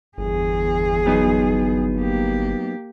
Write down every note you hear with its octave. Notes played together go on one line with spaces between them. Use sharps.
G1 E2 G#4
F#3 B3 D#4
A#3 G4